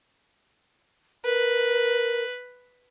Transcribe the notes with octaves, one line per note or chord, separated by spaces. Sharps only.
A#4 B4